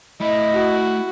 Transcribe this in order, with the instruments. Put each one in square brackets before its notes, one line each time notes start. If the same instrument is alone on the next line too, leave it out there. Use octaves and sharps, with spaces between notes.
[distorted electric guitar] A3 B5 [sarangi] E4 [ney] D#5
[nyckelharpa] F#4